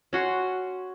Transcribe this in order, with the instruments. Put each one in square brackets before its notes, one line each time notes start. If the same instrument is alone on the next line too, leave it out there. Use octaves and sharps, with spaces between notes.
[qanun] C#4 F#4 C6